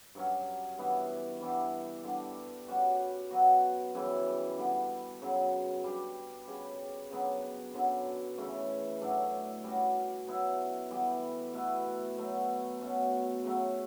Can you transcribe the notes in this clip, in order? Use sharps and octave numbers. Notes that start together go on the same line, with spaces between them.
G2 F#3 C#4
G2 E3 B3
E3 G3 B3 D4
D3 G3 D4
G3 C#4 F#4
F#3 B3 F#4
F#2 C#3 E3 G3
D3 G3 B3
F#2 C#3 F#3
G3 D4 G4
C#3 G3 C#4
C#3 F#3 B3 D4
F#2 D3 F#3 C#4
C#3 E3 A3 C#4
A2 F#3 A3 D4
G3 C#4 F#4
F#3 B3 E4
E3 G3 B3
B2 A3 E4 B4
B2 F#3 A3
B2 A3 C#4
C#3 F#3 A3